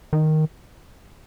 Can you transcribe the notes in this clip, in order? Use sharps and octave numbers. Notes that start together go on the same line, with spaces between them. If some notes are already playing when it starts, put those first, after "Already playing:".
D#3